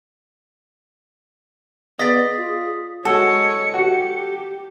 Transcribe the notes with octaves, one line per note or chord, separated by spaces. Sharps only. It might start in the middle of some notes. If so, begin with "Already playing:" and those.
B3 G#4 D5 D#5 D#6 B6
F4
G#3 F#4 A4 C#5 C#7
F#4 G4